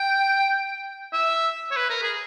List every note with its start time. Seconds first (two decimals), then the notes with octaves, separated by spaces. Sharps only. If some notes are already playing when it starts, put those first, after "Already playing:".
Already playing: G5
1.13 E5
1.71 C#5
1.77 B4
1.90 A#4
2.03 G#4